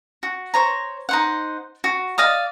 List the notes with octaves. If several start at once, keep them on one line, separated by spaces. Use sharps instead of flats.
F#4
C5 C#5 A#5
D#4 C5 F#5
F#4
D5 D#5 F5 D#6